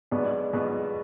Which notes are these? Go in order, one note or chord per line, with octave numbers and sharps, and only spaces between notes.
B1 B2 G#3 B3 D4
B1 B2 G#3 B3